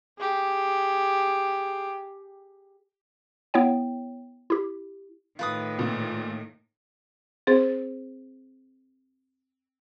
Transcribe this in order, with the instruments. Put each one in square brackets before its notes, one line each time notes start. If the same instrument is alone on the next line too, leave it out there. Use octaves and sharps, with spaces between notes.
[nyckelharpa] G4 G#4
[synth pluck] B3 E4 C#5 G5
E4 G4
[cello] A2 D#3 [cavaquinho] F4 B4 D#6
[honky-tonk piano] A#2
[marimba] C4 G#4 C5 A6